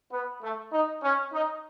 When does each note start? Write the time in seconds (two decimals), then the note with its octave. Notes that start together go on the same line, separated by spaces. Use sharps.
0.12 B3
0.42 A3
0.73 D#4
1.03 C#4
1.33 D#4